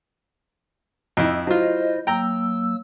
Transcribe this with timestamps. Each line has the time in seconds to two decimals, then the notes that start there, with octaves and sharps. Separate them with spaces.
1.17 F2 D#4 E4
1.47 F#3 E4 F4 C5 D#5
2.07 F#3 A#3 G5 A#5 E6